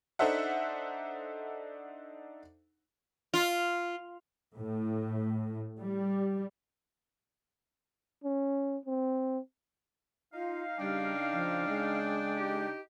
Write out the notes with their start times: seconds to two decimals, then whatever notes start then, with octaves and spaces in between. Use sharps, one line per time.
0.19 D4 D#4 A4 C5 E5 F#5
3.34 F4
4.57 A2
5.80 G3
8.24 C#4
8.86 C4
10.34 D#4 F4 F5
10.79 C#3 G3 D4 G5
11.32 F3
11.68 G#3
12.37 D#4 G4